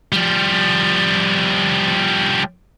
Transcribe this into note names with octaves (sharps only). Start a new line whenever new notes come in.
F3 G3